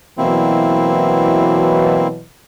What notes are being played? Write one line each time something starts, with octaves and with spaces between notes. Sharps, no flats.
B2 E3 F#3 A#3 C4 E4